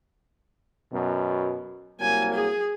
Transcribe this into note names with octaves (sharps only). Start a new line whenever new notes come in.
F#2 B2
C2 F#3 A#3 G#5
G#4